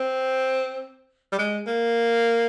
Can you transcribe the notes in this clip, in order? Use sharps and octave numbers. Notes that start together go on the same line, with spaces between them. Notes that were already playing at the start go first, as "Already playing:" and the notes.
Already playing: C4
G3
G#3
A#3